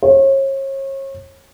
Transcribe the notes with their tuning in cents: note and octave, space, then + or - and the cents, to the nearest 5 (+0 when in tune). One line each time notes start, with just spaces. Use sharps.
C#5 -35